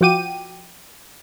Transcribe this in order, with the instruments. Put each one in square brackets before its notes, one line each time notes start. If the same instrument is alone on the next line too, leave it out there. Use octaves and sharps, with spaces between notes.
[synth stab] F3 F4 F#4 G5 D6 D#7